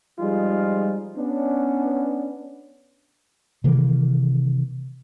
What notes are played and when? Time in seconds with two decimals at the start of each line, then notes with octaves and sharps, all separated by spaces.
0.19 F3 G3 G#3 D#4 F4 G#4
1.17 B3 C#4 D4
3.64 C3 D#3 E3 A#3